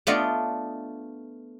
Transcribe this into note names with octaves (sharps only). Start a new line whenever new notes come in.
A3 B3 D4 F4 D5 D#5